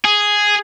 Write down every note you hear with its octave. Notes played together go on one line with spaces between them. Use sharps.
G#4